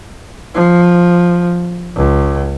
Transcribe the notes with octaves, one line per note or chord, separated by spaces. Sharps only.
F3
C#2